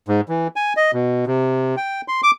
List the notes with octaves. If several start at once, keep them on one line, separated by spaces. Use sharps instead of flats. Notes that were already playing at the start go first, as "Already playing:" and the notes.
G#2
E3
G#5
D#5
B2
C3
G5
C6
D6